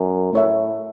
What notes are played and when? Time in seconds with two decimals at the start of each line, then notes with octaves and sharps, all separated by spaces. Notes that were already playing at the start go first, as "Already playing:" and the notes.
Already playing: F#2
0.33 A2 A3 E4 C#5 E5